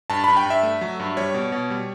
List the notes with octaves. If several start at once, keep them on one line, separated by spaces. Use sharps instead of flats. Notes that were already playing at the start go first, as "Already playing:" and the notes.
G2 A5
G2 B5
G5
G2 E5
A3
F#3
G2
G3 C#5
B2
B2
G3